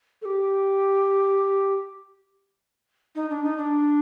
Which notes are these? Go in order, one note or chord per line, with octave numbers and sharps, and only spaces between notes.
A4
G4
D#4
D4
D#4
D4